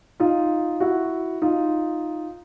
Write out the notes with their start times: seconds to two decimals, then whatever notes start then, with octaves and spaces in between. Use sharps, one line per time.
0.20 D#4 F4
0.80 E4 F#4
1.42 D#4 F4